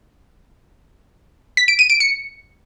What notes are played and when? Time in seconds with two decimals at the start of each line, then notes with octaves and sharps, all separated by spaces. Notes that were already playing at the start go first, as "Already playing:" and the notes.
1.57 B6
1.68 D7
1.79 D#7
1.90 D7
2.00 C#7